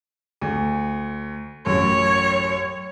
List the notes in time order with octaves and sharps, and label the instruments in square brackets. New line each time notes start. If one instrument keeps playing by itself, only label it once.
[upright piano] D2
[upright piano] A1 F#2 [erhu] C#5